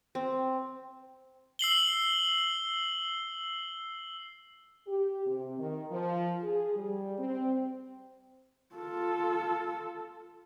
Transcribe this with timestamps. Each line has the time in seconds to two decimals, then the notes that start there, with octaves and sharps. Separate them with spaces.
0.15 C4
1.59 E6 C7 F#7 G7
4.87 G4
5.26 C3
5.59 D#3
5.91 F3
6.42 G#4
6.76 G3
7.19 C4
8.75 F4 A4